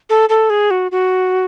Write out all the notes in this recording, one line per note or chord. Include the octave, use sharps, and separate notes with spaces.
A4
A4
G#4
F#4
F#4